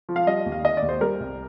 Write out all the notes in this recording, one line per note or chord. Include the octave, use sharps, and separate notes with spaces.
F3
F5
G3 D#5
D#2
F5
D#3 D#5
D5
D#2
C5
G3 A#4
C2